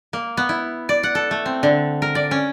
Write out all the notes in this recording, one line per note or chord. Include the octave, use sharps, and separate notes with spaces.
A#3
B3
E4
D5
F#5
A4
A3
C4
D3
A#4
D5
C#4